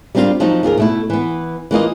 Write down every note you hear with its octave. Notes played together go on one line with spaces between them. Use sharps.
G3 A#3 C4 D4 F4
F3 F#3 C4 D#4
D#2 F4 G#4 A#4
B2 A3 E4
E3 B3
E3 A#3 F4 D#5